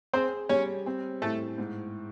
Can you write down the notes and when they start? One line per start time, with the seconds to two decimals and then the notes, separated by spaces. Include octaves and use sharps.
0.13 C4 G#4 C5
0.49 G3 C#4 C#5
0.86 C4
1.22 A2 A3 A4
1.58 G#2